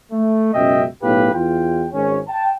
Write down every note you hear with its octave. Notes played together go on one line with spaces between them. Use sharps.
A3
C#2 F#2 B2 D#5 E5 G5
B1 A2 B3 G4 B4 F5
E2 F4 G5
G#1 C#4
G5 A5